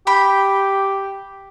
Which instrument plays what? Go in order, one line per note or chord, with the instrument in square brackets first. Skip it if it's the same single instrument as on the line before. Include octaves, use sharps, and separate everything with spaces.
[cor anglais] G4 [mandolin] G5 B5